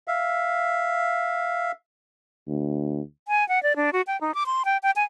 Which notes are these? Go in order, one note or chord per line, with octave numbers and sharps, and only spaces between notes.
E5 F5
D2
G#5
F#5
D5
D4
F#4
G5
D#4
D6
C6
G5
G5
G#5